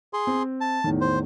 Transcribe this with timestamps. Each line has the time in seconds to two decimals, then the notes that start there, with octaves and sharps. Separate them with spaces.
0.13 G#4 C6
0.27 C4
0.61 A5
0.84 E2 A2 D#3
1.01 C5